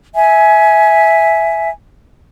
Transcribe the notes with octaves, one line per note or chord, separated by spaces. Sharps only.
E5 G#5